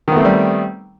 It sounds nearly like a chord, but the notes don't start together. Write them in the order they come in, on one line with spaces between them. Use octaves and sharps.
D#3 B3 A3 C4 G3